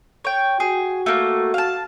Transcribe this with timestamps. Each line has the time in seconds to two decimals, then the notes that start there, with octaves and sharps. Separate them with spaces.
0.25 C#5 G5
0.60 F#4 G#4
1.06 A3 A#3
1.54 F5 A5